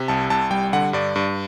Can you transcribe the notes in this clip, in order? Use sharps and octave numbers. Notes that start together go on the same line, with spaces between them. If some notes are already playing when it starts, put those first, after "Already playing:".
Already playing: C3
C2 A5
C2 A5
G3 G5
D3 F#5
G2 D5
G2